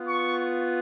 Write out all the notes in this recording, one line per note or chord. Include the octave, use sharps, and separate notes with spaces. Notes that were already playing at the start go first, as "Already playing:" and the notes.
Already playing: B3 F4
C#6